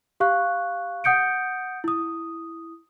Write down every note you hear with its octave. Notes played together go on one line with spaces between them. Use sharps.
G4 F5 C#6 F#6
F#5 D#6 G6 C#7 D7
E4 D#6